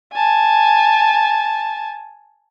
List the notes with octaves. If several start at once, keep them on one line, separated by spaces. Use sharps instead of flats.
G#5 A5